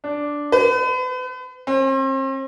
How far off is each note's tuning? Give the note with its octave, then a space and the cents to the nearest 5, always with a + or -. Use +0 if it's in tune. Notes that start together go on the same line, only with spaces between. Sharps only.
D4 -5
B4 +40
C4 +40